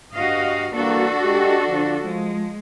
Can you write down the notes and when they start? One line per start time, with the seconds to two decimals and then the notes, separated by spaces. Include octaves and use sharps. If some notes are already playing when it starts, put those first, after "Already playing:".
0.13 G2 F#4 D#5 F5
0.74 E3 G3 A#3 D4 F#4 A4
1.24 G#3 G4
1.68 D3 F3
2.04 F3 G#3